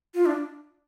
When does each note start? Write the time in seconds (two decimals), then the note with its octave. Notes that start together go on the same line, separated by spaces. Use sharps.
0.14 F4
0.26 D4